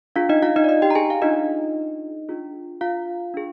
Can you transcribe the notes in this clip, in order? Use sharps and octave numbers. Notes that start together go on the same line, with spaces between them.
D4 F4 G#4 F5
D#4 D#5
F4 F5
D#4 D#5
D5
D#4 D#5
G4 G5
A#5
G#4 G#5
F5
D4 D#4 F4 G#4 D#5
D4 F4 G#4
F4 F5
D4 G#4